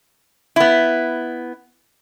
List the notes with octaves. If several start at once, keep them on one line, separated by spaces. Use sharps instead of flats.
B3 E4